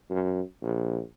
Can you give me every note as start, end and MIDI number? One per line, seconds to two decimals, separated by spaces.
0.10 0.41 42
0.62 1.00 34